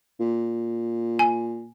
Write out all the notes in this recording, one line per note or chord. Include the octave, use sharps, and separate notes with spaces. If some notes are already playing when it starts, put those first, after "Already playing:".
A#2
G#5